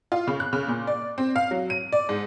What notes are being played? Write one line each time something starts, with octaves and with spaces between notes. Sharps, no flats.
F4
C#3
F#6
C#3
A#2
D5
C4
F5
F#3
D#7
D5
G#2